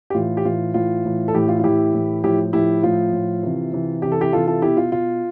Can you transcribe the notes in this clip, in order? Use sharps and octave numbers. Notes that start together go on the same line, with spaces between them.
G4
A2 E3 F4
G4
A2 E3 F4
A2 E3 F4
A2 E3
A4
A2 E3 E4 G4
F4
F4
A2 E3 E4 G4
A2 E3
A2 F3 E4 G4
A2 F3 E4 G4
A2 F3 F4
A2 F3
C3 E3
C3 E3
C3 E3 G4
A4
E4 G4
C3 E3 F4 A4
F4 A4
B2 E4 G4
F4
B2 F4